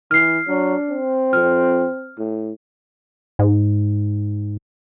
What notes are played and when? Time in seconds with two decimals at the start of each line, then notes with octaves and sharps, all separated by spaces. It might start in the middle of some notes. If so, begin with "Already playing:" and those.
0.11 E3 F6 C7
0.48 F#3 D4
0.91 C4
1.33 F2 F6
2.18 A2
3.39 G#2